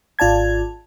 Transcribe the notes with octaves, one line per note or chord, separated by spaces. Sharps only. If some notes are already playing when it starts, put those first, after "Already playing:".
G#1 F4 D5 A5 G#6